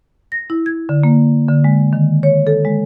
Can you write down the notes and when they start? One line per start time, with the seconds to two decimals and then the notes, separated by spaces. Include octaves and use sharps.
0.32 A#6
0.50 E4
0.66 G#6
0.89 D3
1.04 A#3
1.48 D3
1.64 G#3
1.93 D#3
2.23 C#5
2.47 A4
2.65 G#3